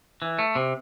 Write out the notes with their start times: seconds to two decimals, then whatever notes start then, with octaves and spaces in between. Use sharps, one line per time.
0.22 E3
0.39 A3
0.55 C3